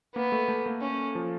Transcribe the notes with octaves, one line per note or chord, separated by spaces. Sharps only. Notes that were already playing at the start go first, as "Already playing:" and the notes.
A#3 B3
A3
A3
A#3
C#4
F3